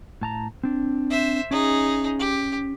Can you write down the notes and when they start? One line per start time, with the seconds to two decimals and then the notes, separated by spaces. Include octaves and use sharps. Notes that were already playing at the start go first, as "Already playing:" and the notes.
0.21 A2 A5 A#5
0.63 C4 D4
1.10 C5 E5
1.51 C#4 D#4 G#4
2.19 G4